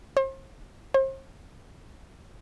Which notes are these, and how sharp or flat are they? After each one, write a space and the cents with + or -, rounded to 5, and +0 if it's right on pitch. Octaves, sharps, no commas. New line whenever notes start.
C5 +40
C5 +40